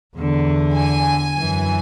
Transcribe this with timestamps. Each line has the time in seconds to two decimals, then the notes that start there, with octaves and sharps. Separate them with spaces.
0.14 E2 D3
0.75 G#5
1.35 F#2 E3